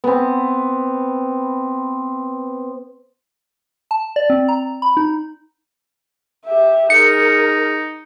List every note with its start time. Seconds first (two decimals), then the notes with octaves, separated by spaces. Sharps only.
0.04 B3 C4
3.91 A5
4.16 D5
4.30 C4
4.49 A#5
4.82 B5
4.97 D#4
6.45 G4 E5
6.90 D#4 G#4 A#4 C#7